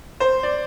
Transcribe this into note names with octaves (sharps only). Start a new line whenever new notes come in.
C5
D5